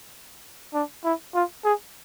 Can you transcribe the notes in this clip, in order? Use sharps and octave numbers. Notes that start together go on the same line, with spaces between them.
D4
E4
F4
G#4